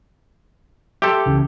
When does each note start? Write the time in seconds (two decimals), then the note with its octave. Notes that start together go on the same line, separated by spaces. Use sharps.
1.02 G4 A4 E5 C6 D6
1.26 C#2 C#3 E3